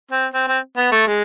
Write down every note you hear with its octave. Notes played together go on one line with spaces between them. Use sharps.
C4
C4
C4
B3
A3
G#3